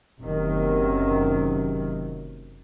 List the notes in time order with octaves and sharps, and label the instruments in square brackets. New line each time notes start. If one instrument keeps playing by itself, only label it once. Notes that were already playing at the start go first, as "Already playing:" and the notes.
[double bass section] F#1 C3 D#3 F#3